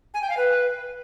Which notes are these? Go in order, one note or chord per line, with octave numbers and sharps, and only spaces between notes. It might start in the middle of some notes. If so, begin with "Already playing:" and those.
G#5
G5
F5
B4